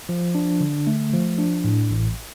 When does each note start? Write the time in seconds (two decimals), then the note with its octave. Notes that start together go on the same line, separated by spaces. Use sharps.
0.09 F3
0.35 D4
0.61 D3
0.87 A3
1.13 F3
1.38 D4
1.64 A2
1.91 A1